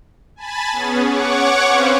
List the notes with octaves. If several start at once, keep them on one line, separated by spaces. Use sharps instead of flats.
G#5 A5 B5 A6
B3 C#4 G#4
C#5 F#5 C#6 D6
C4 C#4 B4 C5 F5